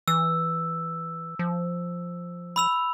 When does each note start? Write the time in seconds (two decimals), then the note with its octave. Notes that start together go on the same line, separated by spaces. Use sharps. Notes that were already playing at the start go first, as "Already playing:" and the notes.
0.08 E3 E6
1.39 F3
2.56 B5 E6 F7